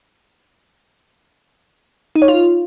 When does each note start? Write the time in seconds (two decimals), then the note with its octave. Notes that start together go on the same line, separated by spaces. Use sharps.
2.16 D#4
2.22 C#5
2.28 F4